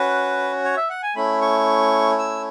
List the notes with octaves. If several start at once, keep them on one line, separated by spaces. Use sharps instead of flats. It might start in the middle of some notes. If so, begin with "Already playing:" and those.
Already playing: C#4 F#4 B4
C#5
E5
F#5
G#5
A3 C#4 E4 B5
C#6
E6